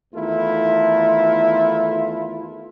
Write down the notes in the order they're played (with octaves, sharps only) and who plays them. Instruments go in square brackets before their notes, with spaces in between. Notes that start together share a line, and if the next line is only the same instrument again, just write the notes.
[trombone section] E2 D#3 A3 E4 F4